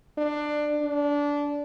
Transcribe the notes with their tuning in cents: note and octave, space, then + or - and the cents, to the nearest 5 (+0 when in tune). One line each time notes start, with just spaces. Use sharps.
D4 +15
D4 -20